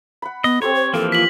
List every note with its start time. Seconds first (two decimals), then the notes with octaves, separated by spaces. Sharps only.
0.22 F#5 B5
0.44 B3 D#5
0.62 C4 G4 A4 C#5 C6
0.75 C5
0.94 E3 F3 A#3 A4 F5
1.12 F4 B6 F#7